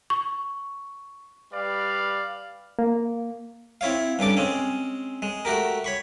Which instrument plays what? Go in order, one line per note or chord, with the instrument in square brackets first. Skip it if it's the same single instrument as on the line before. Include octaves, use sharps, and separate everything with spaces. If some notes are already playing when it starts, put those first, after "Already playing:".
[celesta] C#6
[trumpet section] G3 B4 D5 F5
[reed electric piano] A#3
[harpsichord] C4 E4 C#5 F5
G2 C#3 A4 D6
G#3 C4 C#4
G#3
A3 F#4 G4 A#4
C#5 B5 C#6